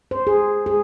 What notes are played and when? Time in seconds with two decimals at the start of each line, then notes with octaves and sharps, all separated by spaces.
0.11 C5
0.27 G#4
0.66 G#4